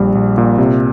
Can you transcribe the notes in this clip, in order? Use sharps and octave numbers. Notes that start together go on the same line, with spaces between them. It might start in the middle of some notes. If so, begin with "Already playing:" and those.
Already playing: A#1 G3
A#1
A#2
C3